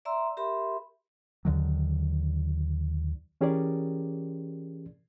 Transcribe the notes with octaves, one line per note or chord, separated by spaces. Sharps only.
D5 E5 A#5 C6 E6
G4 A#4 E5 B5 C6
D#2 D3 D#3 F#3
E3 C#4 G4 G#4 A#4 D5